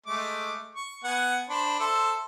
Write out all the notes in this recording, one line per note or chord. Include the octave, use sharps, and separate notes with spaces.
G#3 A3 D6
C#6
B3 F#5 G#5
D4 C5 B5
A4 C5 E5